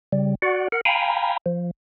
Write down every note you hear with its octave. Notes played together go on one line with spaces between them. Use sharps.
C#3 G3
F#4 D5 F#5
A#4 F#5
F5 G5 G#5 A#5 B5
F3